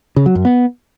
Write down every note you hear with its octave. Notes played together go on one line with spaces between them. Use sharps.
C#3
F#3
F#2
B3